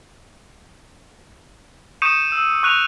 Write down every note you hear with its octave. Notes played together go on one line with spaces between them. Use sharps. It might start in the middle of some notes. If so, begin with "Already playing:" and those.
C#6 D#6 G6 C#7 D#7 E7
E6
C#6 F#6 D#7 F7